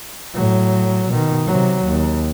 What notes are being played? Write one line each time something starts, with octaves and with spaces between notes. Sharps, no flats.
A2 F#3
B2 D#3
C3 F#3
D#2